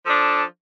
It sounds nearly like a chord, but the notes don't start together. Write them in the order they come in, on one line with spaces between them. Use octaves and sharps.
F3 A4 D4